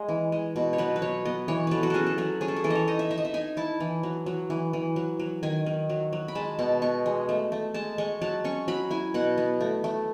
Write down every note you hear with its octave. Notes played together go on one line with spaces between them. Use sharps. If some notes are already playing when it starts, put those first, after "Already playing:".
Already playing: G#3 G#4
E3
G#3
B2
C#5
F#3 B4
B4
F#3 C#5
B3 D#5
E3 C#5
F#3 A4 B4
F#4
C#4 G#4 A4
A4
F#3 F#4
C#4 G#4
A4
G#4
E3 A4
D#5
C#5
D#4 D#5
E5
D#4 E5
D#5
E5
D#4 G#5
E4 A5
E3
F#3
F#3
E3
E3
F#3
F#3
D#3 G#5
D#3
F#3
F#3
B5
G#3 A5
B2 A5
B3 C#6
G#3
A3
A3
G#3 A5
G#3 C#6
F#3 A5
C#4 C#6
F#3 B5
E4 G#5
B2 F#5
B3
A3
A3